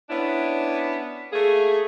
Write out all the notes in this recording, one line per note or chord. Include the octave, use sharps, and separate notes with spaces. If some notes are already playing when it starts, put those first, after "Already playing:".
B3 C#4 D4 E4
A3 A#3 G#4